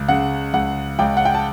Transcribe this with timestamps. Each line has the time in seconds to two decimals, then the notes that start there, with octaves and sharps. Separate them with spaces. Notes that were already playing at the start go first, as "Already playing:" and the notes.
Already playing: C#2
0.09 C#3 F#5
0.54 C#2 F#5
0.99 C#2 G5
1.17 F#5
1.25 G5
1.35 A5